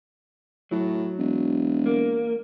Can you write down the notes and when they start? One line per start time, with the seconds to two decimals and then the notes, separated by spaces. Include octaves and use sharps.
0.71 A2 F#3
1.19 E1
1.86 A#3